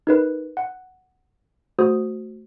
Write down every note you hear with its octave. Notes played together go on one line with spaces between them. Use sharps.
D#4 A#4 B4
F#5
A3 F#4 C5 D#6